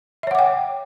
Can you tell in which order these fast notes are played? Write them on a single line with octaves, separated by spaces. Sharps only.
E5 C#5 F#5 D6 G5